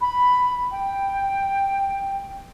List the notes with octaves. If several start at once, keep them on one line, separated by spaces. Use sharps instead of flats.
B5
G5